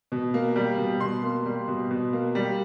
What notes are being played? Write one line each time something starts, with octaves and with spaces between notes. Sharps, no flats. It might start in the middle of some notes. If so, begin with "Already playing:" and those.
B2
A#3
G3
B2
B2 C6
A#3
G3
B2
B2
A#3
G3